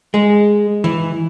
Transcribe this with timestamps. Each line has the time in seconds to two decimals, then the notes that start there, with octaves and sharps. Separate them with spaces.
0.14 G#3
0.84 E3